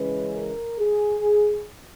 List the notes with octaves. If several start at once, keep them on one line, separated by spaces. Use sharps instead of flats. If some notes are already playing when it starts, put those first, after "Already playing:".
Already playing: C#3 E3 G#3 C#4 B4
A#4
G#4